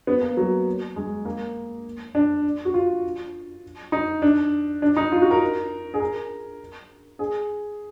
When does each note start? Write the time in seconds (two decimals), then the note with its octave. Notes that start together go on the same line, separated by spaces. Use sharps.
0.07 B3
0.22 A#3
0.37 F#3
0.96 G#3
1.25 A#3
2.15 D4
2.65 F#4
2.74 F4
3.92 D#4
4.22 D4
4.82 D4
4.97 D#4
5.12 F4
5.22 F#4
5.31 A#4
5.94 G#4
6.00 A#4
7.19 G#4